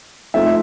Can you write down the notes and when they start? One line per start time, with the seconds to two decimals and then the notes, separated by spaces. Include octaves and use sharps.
0.34 F3 A3 C4 D#4 E5